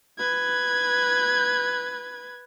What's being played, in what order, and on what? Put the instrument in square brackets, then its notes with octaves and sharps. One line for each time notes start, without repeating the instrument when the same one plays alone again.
[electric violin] B4 G#6